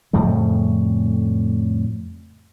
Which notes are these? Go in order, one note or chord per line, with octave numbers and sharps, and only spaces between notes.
F2 A2 C#3 G3